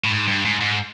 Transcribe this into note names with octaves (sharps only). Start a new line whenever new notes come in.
A2
G#2
G2
G#2
G#2